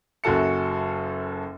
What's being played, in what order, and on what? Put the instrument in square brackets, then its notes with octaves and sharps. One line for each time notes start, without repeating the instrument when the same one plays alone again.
[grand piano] F#1 F#2 F#4 A4 C#7